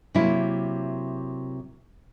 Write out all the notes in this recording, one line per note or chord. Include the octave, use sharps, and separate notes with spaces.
C3 F#3 A#3 E4